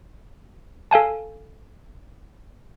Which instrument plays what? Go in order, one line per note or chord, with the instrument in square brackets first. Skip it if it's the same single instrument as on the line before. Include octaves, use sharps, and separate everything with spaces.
[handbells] A4 F5 G#5 A5